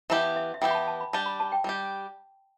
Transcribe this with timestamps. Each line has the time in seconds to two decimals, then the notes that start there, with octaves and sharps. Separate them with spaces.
0.10 E3 B3 E4 G4 A5
0.36 E5
0.54 E5
0.62 E3 B3 E4 G4 G5
0.71 B5
0.75 A5
0.88 A5
1.01 B5
1.13 G3 D4 G4 A5
1.26 B5
1.40 A5
1.52 G5
1.64 G3 D4 G4